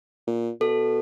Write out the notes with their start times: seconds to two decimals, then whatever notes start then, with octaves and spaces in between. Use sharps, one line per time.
0.27 A#2
0.61 B2 A4